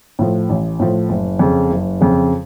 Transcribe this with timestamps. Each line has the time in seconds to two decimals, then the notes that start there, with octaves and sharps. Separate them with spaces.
0.19 A2 F3
0.49 A1
0.79 A2 F3
1.09 F#1
1.39 F2 C#3
1.70 F#1
2.01 F2 C#3